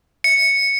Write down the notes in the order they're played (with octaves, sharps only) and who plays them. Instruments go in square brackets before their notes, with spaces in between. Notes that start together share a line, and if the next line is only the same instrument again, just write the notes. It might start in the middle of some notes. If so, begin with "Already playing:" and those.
[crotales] C#7